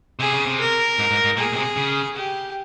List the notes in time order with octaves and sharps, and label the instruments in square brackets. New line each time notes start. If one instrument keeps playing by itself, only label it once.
[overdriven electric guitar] C3 [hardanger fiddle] G#4
[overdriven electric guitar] C#3
C3
[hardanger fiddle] A#4
[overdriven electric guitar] G#2
G#2
G#2
[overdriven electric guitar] A#2 [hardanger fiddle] G#4
[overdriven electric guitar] A#2
C3
C#3
[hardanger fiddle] G4